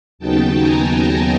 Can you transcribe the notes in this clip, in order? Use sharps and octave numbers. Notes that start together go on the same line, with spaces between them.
D#2 C#3 F#3 B3 D#4 G5 A5
G#5 A#5
G#5 A#5